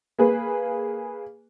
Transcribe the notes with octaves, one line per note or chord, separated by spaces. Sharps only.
A#3 G#4 B4